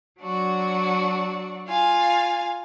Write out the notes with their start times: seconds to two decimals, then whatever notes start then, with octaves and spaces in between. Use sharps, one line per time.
0.21 F#3 D4 F#4
1.67 F4 F5 G#5